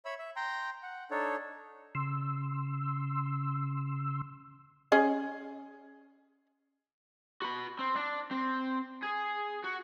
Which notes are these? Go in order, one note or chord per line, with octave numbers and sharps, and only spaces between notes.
C#5 E5 B5 E6
E5
G5 A#5 C6
F#5
D4 D#4 A4 C#5
C#3 C6 E6
C#4 G#4 D#5
F#4 B5
C4
D4
C4
G#4
F#4